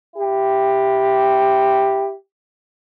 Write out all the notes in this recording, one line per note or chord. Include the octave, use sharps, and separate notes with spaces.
E4 G4